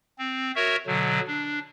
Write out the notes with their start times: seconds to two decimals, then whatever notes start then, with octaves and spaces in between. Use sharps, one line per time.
0.19 C4
0.56 F#4 A#4 C#5 E5
0.86 B2 D3 F#3
1.27 D4